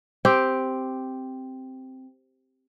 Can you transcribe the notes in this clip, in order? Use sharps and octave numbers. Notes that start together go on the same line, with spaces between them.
C4 G4